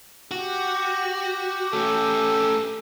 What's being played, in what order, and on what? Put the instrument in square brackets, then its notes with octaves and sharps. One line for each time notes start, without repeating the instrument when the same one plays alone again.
[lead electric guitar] F#4 [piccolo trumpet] G4
[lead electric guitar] A3 C#4 [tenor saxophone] A4